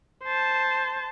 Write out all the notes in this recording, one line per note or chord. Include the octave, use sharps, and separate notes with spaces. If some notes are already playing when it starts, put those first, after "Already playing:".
C5 A5